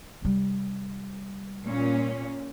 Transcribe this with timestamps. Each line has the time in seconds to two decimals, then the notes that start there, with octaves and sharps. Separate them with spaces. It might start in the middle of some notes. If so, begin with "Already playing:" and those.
0.22 C3 G3
1.66 A#2 C#4